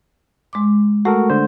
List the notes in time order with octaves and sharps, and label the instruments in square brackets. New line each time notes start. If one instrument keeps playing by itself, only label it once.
[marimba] G#3 C6 D6
[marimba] A3 [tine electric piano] F#4 A4 A#4
[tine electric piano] D3 C5